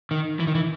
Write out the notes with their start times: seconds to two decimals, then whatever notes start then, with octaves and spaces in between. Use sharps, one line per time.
0.11 D#3
0.40 E3
0.47 D#3
0.55 E3